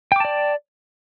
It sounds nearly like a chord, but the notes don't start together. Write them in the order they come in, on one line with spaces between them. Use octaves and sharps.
G5 D6 A5 D5